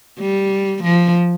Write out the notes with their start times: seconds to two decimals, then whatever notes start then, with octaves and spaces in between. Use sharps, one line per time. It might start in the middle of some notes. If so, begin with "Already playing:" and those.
0.20 G3
0.84 F3